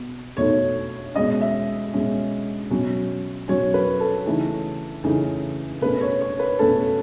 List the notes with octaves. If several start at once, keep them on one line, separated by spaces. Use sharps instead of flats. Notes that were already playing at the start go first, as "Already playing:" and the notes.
Already playing: B2
B2 A3 D#4 C#5
B2 G#3 C#4 D#5
E5
B2 G#3 C#4
B2 F#3 C#4
B2 F#3 C#4 C#5
B4
A4
C#3 E3 A3 D#4
C#3 E3 A3 D#4
B2 A3 C#4 B4
C#5
C#5
B4
B2 A3 C#4 A4